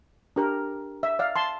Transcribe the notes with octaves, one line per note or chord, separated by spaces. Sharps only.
D4 G4 A#4
E5
D5 F5
A5 C6